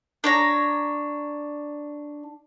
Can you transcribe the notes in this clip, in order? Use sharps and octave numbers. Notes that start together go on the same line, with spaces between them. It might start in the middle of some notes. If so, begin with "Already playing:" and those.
D4 C#5 A#5